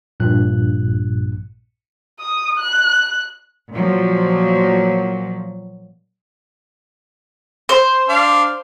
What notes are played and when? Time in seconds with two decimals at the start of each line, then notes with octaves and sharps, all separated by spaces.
0.20 A#1 G2 A#2 F#6
2.20 D#6
2.58 F#6
3.72 A#2 F3 F#3
7.69 C5
8.09 D4 F5